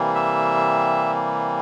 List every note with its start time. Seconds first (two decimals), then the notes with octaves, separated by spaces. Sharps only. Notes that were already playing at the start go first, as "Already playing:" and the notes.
Already playing: C3 E3 G3 A#3
0.15 E5